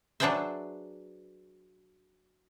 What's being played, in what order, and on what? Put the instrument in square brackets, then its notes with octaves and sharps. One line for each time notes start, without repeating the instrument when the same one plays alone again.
[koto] F#3 D4 G#4 B4 C5 E5